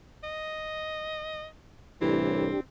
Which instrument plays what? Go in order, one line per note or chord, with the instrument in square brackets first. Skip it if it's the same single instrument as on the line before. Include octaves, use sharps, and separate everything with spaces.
[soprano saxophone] D#5
[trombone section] C2 A2 [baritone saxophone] E3 [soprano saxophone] C4 [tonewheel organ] D4 G4